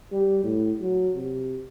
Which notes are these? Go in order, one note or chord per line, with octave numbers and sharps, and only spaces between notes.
G3
A2
F#3
C3